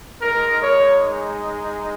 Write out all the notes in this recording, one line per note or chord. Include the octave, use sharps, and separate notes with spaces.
G#3 D#4 A#4
C#5